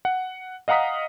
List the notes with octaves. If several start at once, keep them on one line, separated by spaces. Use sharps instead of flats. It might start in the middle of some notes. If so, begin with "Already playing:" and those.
F#5
D#5 F5 F#5 A#5 D#6 B6